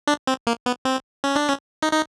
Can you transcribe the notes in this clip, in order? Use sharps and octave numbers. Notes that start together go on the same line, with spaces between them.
D4
C4
A#3
B3
C4
C#4
D4
C#4
D#4
D#4